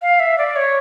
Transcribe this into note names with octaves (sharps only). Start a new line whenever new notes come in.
F5
E5
D5
C#5